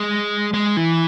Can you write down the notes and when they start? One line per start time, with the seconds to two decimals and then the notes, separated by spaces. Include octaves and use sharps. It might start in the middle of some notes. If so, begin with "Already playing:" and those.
Already playing: G#3
0.54 G#3
0.77 E3